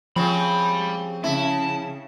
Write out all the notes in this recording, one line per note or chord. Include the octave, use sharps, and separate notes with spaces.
C#3 F3 C4 G4 B5
C#3 E4 A5